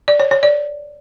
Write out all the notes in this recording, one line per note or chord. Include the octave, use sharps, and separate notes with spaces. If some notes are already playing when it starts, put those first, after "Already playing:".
D5
C#5
C#5
D5